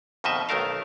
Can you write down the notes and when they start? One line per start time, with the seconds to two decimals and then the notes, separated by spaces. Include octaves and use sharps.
0.24 F2 B2 D#3 D#5 E5
0.49 B1 D#3 A3 A#4 F5